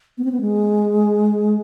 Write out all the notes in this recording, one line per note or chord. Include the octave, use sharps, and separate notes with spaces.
B3
C4
B3
G#3